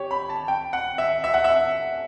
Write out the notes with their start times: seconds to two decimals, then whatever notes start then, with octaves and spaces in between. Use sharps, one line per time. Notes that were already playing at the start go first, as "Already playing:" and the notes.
Already playing: G4 C#5
0.11 B5
0.29 A5
0.48 G5
0.73 F#5
0.98 E5
1.24 E5
1.34 F#5
1.44 E5